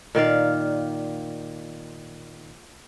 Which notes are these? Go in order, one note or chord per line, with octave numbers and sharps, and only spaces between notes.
A#2 D#3 D5 F5